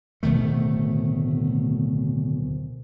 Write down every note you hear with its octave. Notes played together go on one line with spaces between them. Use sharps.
D1 B2 D#3 A3